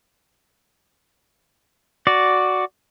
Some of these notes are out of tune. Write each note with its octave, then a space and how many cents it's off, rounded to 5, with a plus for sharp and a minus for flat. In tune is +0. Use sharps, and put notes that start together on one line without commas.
F#4 +0 D5 +0